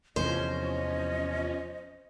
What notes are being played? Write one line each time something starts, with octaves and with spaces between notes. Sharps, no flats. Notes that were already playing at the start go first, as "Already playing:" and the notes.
E2 C3 E3 F3 C#4 C5 D#5